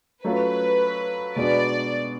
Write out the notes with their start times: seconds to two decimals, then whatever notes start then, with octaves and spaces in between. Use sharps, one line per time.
0.24 F#3 A3 C#4 F4 B4
1.36 B2 G#3 B3 D4 F#4 D5